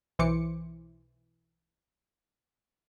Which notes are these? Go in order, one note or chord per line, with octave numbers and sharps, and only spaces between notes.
B1 E3 C5 D6 C#7